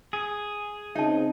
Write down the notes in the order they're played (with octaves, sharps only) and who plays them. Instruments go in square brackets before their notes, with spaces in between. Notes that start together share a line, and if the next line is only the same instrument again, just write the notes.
[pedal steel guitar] G#4
[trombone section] C#3 C4 [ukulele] D#4 [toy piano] E5 A5